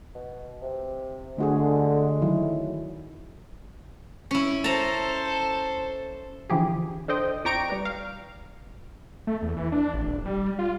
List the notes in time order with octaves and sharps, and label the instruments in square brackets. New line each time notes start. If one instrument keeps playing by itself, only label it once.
[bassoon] B2
C3
[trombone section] D3 [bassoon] G#3 [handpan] A3 F#4 G#4
[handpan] D#3 F#3 E4
[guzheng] C#4 E4
[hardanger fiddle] A4 C5 [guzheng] A5 A#5
[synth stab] D3 E3 F3 G4 G#4
D4 A4 C5 D#5 G5
F2 D5 G5 A#5 C#6 D7
G3 B4
F5
[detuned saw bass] A3
E2
E3
D4
A1
D#1
G3
F4